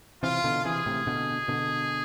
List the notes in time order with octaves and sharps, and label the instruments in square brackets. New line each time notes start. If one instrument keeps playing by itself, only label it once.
[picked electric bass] C3 E3 [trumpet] F4
[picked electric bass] B2 D3
[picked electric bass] C3 E3 [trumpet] G#4
[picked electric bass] A2 C3
B2 D3
B2 D3